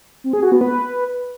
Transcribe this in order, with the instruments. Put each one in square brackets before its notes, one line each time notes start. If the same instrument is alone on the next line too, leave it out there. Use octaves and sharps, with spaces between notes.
[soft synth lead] C4
G#4
F#4
B3
B4